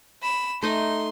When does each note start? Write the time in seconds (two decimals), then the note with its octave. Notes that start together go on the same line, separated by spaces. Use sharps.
0.23 B5 E7
0.62 A3 D#4 D#5 C6